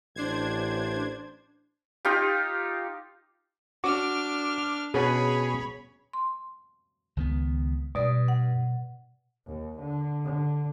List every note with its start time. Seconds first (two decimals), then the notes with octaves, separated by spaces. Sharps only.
0.16 A1 D4 C5 G#6
2.05 D#4 F4 G4
3.84 D4 F#4 D6 F6
4.94 B2 C#4 G#4 C#5 F#5 B5
6.13 C6
7.17 C#2 D#3 B3
7.95 G2 B2 D5 D#6
8.28 F#5
9.47 D#2
9.80 D3
10.24 D3